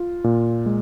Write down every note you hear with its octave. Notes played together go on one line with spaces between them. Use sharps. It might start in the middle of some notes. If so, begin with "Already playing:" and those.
Already playing: F4
A#2
G#3